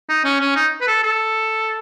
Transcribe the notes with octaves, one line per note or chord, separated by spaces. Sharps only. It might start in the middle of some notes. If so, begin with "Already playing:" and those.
D#4
C#4
C#4
D#4
B4
A4
A4